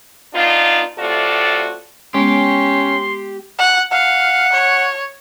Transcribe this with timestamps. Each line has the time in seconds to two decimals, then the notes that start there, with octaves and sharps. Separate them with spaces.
0.35 B3 D4 D#4 F4
0.98 A2 C3 F4 F#4 A4 D5
2.14 G#3 B3 C#4 G4 C6
3.59 F#5
3.91 F5 F#5
4.53 C#5